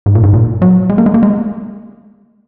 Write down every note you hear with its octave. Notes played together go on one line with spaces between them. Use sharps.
G#2
A#2
G#2
A#2
F#3
G#3
A#3
G#3
A#3
G#3